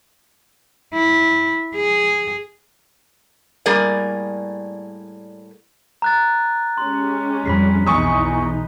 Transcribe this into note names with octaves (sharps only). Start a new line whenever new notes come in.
E4
G#4
A2 G3 A#3 G#4 A#4 D5
A#5 F#6 A6
G#3 C#4 G4 C6
F2 G3 B5 B6 C7
B1 E2 E3 D#4 C#6 D#6